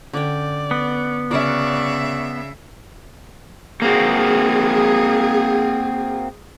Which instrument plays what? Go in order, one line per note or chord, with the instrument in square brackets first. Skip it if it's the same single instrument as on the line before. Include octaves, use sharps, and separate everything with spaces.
[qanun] D3 C#4 G5 [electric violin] D5
[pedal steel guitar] B3
[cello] C#3 E5 [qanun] F#4 A#4 A#5 [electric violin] D5 C#6
[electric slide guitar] A#3 C4 F#4 [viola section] G#4